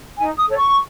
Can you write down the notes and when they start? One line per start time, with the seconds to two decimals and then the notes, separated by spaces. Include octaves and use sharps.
0.18 D#4 G#5
0.37 D#6
0.47 A4 C#5
0.56 C#6